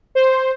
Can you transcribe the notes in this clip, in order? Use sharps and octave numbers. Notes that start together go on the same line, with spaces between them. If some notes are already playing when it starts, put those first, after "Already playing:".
C5